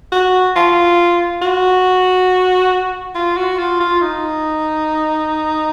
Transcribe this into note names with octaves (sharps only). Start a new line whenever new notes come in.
F#4
F4
F#4
F4
F#4
F4
F4
D#4